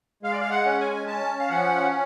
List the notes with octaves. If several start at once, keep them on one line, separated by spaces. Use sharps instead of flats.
G#3 F5
D5
F5
F#5
C#4
G#5
C#4 A5
F5
F3 F#5